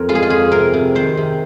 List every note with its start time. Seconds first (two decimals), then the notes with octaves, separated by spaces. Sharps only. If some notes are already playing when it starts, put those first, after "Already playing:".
Already playing: F2 C4 A#4
0.09 G#3 F4
0.15 G#4
0.23 F4
0.30 F2 G#4
0.52 C3 A#4
0.73 C3
0.95 D#3 C5
1.17 C3